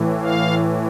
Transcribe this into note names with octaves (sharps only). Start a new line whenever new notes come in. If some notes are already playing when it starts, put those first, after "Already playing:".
Already playing: A2 E3
F5